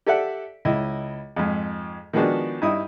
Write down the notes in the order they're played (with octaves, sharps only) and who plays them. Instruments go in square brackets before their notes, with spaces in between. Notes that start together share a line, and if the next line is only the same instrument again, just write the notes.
[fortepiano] G4 A4 D5 E5 F#5
C#2 E4 D#5
F2 G#2
D#3 F3 G#3 B3 D4 F#4
G2 D#4 E4 D#6